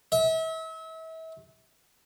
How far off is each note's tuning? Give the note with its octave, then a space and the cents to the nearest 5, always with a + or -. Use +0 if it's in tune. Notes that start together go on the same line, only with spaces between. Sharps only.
E5 -35